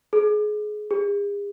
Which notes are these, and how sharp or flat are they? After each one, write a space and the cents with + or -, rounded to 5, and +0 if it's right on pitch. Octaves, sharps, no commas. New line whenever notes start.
G#4 +25
G#4 -40